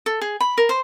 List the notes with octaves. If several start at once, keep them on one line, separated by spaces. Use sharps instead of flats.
A4
G#4
B5
A#4
C5